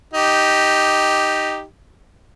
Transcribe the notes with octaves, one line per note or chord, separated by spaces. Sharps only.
D#4 G4